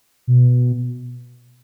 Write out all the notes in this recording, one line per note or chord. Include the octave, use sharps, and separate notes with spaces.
B2